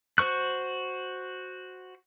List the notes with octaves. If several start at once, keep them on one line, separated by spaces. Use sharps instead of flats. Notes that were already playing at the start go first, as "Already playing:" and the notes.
F#4 C5 C#6 F#6